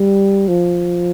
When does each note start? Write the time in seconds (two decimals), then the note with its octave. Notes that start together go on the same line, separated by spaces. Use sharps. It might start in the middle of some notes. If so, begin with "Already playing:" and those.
Already playing: G3
0.48 F3